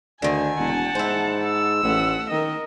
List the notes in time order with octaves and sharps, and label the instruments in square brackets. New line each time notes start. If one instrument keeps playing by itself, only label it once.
[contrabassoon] D2 [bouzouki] D3 D#3 [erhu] G#5
[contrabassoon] E1 [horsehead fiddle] F#5 A5
[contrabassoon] G#2 [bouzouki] E4 C5
[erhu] E6
[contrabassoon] A1 [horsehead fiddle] A3 F#5
[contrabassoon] D#3 [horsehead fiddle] A#4 D#5